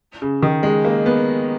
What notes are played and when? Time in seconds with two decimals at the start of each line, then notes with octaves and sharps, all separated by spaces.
0.22 C#3
0.43 D#3
0.63 G#3
0.85 A#3
1.06 B3